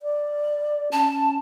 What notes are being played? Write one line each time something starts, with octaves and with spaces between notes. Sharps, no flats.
D5
C#4 A5